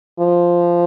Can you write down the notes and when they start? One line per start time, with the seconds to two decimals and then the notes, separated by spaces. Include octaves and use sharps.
0.20 F3